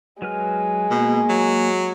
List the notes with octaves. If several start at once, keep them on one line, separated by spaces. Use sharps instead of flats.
F#3 G#3 B4 F6
B2 A#3
F#3